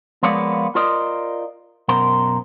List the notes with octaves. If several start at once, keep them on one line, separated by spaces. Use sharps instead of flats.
F3 G#3 A#3 B3 C#5 D5
F4 A#4 C5 D5 D#5
F#2 B2 A#4 C5